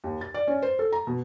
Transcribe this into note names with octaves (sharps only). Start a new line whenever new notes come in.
D#2
A6
D5
C#4
C5
A4
A#5
B2